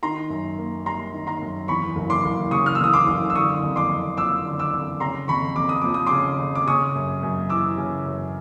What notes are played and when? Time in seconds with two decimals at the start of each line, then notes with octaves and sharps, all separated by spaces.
0.03 D#3 A#5 C6
0.30 F#2
0.58 A#3
0.85 G3 A#5 C6
1.14 D#3
1.27 A#5 C6
1.42 F#2
1.68 E2 B5 C#6
1.96 F#1
2.10 C6 D6
2.25 F#1
2.51 C#3 C#6 D#6
2.66 F6
2.75 E6
2.80 E2 D#6
2.93 C6 D6
3.07 F#1
3.30 E6
3.35 D3 C#6 D#6
3.63 F2
3.76 C6 D6
3.90 F2
4.17 F3 D6 E6
4.46 D3
4.59 D6 E6
4.74 F2
5.00 C#3 A#5 C6
5.28 F2 B5 C#6
5.56 F2 D6
5.69 D#6
5.81 F3 D6
5.94 D#6
6.06 C#3 C6 D6
6.39 F2
6.55 D6
6.67 C#3 C#6 D#6
6.95 F#2
7.23 F#2
7.49 E3 D6 E6
7.77 C#3
8.05 F#2